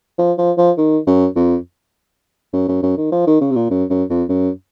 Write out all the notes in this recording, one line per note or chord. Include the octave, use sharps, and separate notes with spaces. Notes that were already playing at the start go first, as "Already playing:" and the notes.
F3
F3
F3
D#3
F#2
F2
F#2
F#2
F#2
D#3
F3
D#3
C#3
C3
A#2
F#2
F#2
F2
F#2